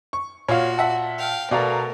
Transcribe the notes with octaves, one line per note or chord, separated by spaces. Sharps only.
C#6
A#2 F#4 C#5 F5
E5 F#5 A5
F5 G5
B2 A3 A#4 D5 F5 A#5